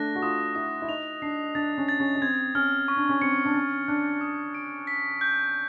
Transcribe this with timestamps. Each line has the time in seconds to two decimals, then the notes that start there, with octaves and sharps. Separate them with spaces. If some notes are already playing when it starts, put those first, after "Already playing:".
Already playing: A3 D4 F#6 A#6
0.16 F#4
0.22 F4 D#6
0.55 E4 D#6
0.82 E4
0.89 D#4 F7
1.22 D4 C7
1.55 D4 A6
1.78 C#4
1.89 A6
2.00 C#4
2.15 C#4
2.22 C4 G#6
2.55 C#4 F6
2.88 C#6
2.97 D4
3.09 C#4
3.21 C4 C#7
3.46 D4
3.54 C#4 A6
3.88 D4 F#6
4.21 D#6
4.54 D7
4.87 B6
5.21 G6